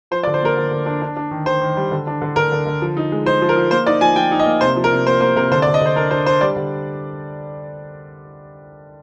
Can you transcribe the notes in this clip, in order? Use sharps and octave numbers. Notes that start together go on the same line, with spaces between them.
F3 C5
D5
D3
C5
A#3 A#4
D3
D3
D4
D4
D4
D#3
D#3 C5
D#3
G3
D3
D4
D3
D3 A#4
D3
D3
F3
D#4
G#3
D#4 C5
F3
A#4
F3
A#3 C5
D#4 D5
F3 G#5
F3 G5
D#4
D#5
A#3
C3 C5
F3
A#4
C3
A#3 C5
A#3 C5
C3 A#4
D3 C5
D5
D3
D#5
D3 C5
D4 A#4
D4 C5
D4 C5
G3 D5
D3